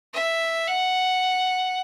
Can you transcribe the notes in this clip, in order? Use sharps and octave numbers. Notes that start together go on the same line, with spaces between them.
E5
F#5